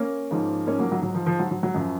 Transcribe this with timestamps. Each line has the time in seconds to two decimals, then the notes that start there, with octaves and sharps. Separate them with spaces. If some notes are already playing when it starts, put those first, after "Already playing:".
Already playing: A#3 C#4
0.31 G#2 F3
0.67 A#3 C#4
0.79 F#3 A#3
0.92 F#3
1.02 F#3
1.15 F3
1.26 F3
1.39 F#3
1.51 F#3
1.63 F#3
1.74 F#2 F3